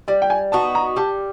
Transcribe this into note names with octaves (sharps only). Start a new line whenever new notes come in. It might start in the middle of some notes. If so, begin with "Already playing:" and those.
G3 D5
G5
G#5
B3 D#4 F#4 A5
A#5
G3 A5